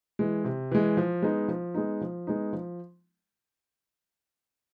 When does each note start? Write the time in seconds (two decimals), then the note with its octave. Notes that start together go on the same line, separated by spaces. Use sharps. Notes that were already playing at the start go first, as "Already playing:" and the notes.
0.19 E3 G#3
0.44 C3
0.72 E3 G#3
0.97 F3
1.22 G#3 B3 D#4
1.48 F3
1.74 G#3 B3 D#4
2.01 F3
2.27 G#3 B3 D#4
2.53 F3